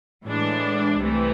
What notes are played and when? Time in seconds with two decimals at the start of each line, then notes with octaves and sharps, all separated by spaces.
0.24 A2 E3 G#3 D4
0.99 C2 C3 E3 A3